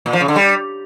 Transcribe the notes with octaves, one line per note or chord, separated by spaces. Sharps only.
A#2
F3
C#3
D3
G3